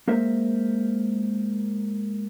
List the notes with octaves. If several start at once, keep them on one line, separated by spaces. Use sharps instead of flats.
G#3 A#3 A#4 C5 E5